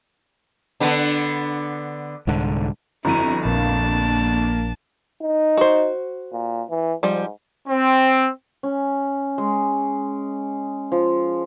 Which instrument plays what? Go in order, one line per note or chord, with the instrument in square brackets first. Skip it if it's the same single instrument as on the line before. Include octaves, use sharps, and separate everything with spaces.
[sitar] D3 B3 D4
[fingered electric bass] C2 G#2 D3
[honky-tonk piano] G1 F2 D#7 [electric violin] E4 F#4 [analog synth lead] A#5
[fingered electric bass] A#1 [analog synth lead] A#3 [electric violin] D4 A5
[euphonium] D#4
[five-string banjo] F#4 C5
[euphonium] A#2
E3
[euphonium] G#2 [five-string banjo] F3 G3
[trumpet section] C4
[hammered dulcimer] C#4
G#3
F3